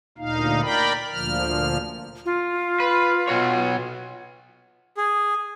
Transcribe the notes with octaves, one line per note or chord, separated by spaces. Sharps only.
D2 A#2 D#4 F5
A#4 D5 G5 B5
D2 A#2 F3 F6
F4
B4
B2 F#4 C#5
G#4